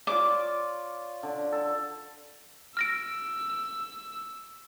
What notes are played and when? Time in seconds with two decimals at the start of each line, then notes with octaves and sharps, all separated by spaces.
0.07 F4 C#5 D5 D6
1.23 D3
1.52 A4
2.77 E6 F6 A#6 D7